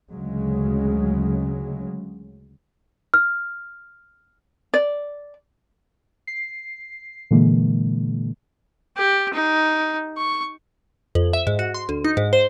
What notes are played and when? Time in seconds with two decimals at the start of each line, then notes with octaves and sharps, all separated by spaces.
0.11 D2 C#3 F#3 G#3
3.14 F6
4.74 D5
6.27 C7
7.31 A#2 D3 E3 G#3 A#3
8.97 G4
9.33 D#4
10.17 C#6
11.15 F2
11.33 E5
11.47 G#2
11.59 F#4
11.74 C6
11.89 D2
12.04 D#4
12.17 G#2
12.33 C5